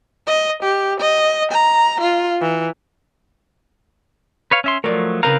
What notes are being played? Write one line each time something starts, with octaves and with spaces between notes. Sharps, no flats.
D#5
G4
D#5
A#5
F4
E3
B4 C#5 F5
C#4 E5 C6
F3 F#3 A3 A#4 D5
C#3 C4 A#4 B4 F5 A#5